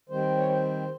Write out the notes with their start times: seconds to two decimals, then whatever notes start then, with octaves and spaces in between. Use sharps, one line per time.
0.09 D#3 G3 C4 C5
0.38 C#5
0.48 C5